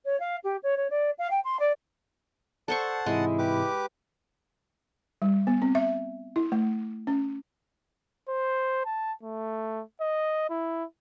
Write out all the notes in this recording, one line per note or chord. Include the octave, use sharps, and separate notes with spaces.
C#5
F5
G4
C#5
C#5
D5
F5
G5
C6
D5
A4 C5 D5 F#5 A5 C#6 C#7
G#2 C3 E3 G#3 E4
G4 B4 D6
G3
B3
C4
E5
E4
A3
C#4
C5
A5
A3
D#5
E4